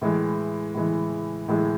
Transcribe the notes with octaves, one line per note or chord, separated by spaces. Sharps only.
A2 E3 G#3
A2 E3 G#3
A2 E3 G#3